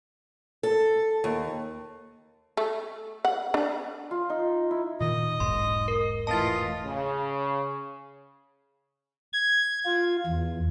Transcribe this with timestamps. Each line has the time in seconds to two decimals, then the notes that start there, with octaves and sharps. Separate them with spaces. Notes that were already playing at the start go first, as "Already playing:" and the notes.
0.63 A4
1.24 D#2
2.57 A3
3.25 F#5
3.54 D4
4.11 F4
4.30 D#4
4.71 E4
5.00 A#2 D#3 D#5
5.40 E1 B1 G#2 C6
5.88 A#4
6.27 A2 E3 F4 D#5 A5 A6
6.85 C#3
9.33 G#6
9.86 F4
10.27 E2